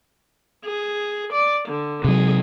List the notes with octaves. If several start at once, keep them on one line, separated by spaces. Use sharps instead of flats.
G#4
D5
D3
C3 F#3 G#4